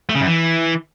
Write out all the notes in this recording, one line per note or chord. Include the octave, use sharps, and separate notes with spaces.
A3
C#3
F#2
E3